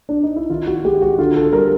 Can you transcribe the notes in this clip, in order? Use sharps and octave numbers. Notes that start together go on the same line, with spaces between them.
D4
D#4
E4
D#3 F4
F#4
G#3 G4
F#4
D3 F4
A4
G3 A#4